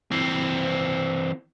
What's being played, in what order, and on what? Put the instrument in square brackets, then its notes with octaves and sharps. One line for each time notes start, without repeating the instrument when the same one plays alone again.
[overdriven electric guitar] E3 C4